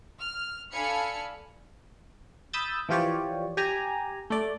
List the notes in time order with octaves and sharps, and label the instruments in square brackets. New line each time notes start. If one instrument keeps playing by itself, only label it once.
[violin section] F6
D4 A4 F5 G#5 B5 C#7
[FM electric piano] B5 D#6 E6 G6 A6
E3 F3 F4 G4 C#5 D5
G4 G#5 A#5
A3 D5